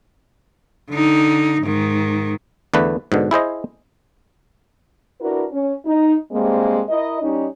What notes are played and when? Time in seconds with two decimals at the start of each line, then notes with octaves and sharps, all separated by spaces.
0.90 D3 D#4
1.62 G#2 D#3
2.74 E2 D3 A3 B4
3.12 G#2 B2 D3
3.31 E4 G#4 C5 D#5
5.21 D4 E4 F#4 A#4 B4
5.53 C#4
5.86 D#4
6.33 G2 G#3 A#3 C4
6.90 E4 A#4 D#5
7.22 G3 C#4 D#4